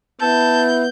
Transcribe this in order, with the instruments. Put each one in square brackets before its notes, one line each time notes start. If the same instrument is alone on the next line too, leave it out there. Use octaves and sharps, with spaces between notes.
[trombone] B3 [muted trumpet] E4 [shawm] A5 [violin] G6